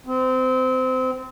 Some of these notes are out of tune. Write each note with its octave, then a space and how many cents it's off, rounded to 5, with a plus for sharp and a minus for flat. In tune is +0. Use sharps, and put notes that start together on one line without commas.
C4 -25